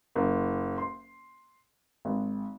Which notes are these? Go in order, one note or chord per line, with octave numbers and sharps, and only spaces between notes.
F#1
C6
G#1